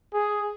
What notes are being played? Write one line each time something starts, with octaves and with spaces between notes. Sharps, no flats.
G#4